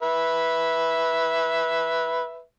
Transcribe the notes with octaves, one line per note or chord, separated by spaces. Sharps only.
B4 E5